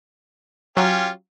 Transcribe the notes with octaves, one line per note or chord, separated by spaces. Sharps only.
F#3 C#4 F4 G4